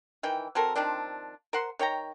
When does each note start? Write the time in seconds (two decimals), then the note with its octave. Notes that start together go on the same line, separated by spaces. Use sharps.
0.23 D#3 E3 G5
0.55 F#3 C4 A4 A#4
0.75 D#3 F3 C4 D4
1.53 A#4 C5 F#5 C6
1.79 D#3 C#5 G5 A#5